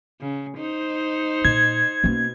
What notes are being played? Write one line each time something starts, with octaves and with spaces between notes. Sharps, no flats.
C#3
D#4 C5
A#2 G#6
B2 A#3 C#4